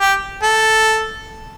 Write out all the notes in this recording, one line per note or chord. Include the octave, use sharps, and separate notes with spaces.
G4
A4